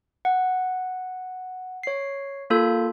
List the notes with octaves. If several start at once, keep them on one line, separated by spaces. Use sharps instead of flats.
F#5
C#5 C7
A#3 F4 A4 G6